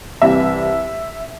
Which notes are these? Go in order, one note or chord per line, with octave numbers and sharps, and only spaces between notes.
C2 C3 E3 E5